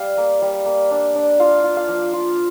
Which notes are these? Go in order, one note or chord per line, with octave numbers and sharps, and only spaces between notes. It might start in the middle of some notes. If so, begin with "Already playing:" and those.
Already playing: G3 F5
A#3
G3
A#3
D4
D4
F4 F5
F4
F5
F3
F4